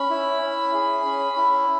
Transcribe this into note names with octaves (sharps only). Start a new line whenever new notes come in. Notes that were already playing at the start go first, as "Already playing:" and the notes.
Already playing: C#4 B5
E4
C#4
G#4
C#4
E4